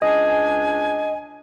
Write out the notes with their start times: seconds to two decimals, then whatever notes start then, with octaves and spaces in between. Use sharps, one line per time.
0.02 C#2 D4 D#5 G#5